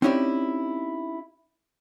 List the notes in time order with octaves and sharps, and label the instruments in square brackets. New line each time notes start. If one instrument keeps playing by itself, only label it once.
[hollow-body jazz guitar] C4 C#4 D#4 E4 G4 D5